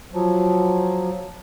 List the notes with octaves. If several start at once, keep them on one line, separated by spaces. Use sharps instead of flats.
F3 F#3